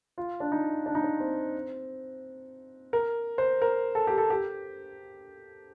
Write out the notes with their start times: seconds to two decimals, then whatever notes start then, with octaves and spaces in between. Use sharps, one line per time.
0.18 F4
0.40 D4
0.52 D#4
0.86 D4
0.95 D#4
1.04 D4
1.20 C4
2.93 A#4
3.38 C5
3.62 A#4
3.95 A4
4.07 G4
4.18 A4
4.30 G4